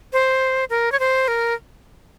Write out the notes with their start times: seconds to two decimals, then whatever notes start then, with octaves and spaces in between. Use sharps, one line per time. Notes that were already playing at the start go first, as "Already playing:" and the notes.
0.13 C5
0.70 A#4
0.92 C#5
0.99 C5
1.28 A#4